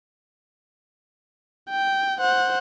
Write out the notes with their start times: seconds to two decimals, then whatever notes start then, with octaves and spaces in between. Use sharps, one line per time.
1.70 G5
2.20 C5 F#5